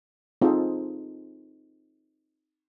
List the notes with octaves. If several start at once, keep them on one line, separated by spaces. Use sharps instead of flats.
C4 D#4 F4 G#4 A4 C5